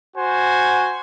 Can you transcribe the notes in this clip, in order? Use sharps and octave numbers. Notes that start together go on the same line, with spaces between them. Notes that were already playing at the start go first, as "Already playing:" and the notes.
F#4 C5 G#5